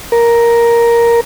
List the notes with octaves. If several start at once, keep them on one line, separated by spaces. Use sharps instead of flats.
A#4